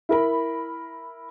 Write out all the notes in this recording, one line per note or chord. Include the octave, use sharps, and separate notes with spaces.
E4 A#4 B5